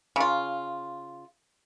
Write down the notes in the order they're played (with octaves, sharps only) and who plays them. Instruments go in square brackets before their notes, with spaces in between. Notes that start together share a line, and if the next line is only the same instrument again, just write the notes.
[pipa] C#3 F4